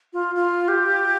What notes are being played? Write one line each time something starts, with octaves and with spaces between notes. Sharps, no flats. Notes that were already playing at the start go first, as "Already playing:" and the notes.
F4
F4
G4